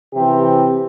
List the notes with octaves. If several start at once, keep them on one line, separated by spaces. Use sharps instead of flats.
C3 E3 C4 G4